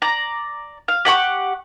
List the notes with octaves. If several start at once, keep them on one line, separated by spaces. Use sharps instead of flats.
D5 A#5
F5
G4 F#5 A5 C#6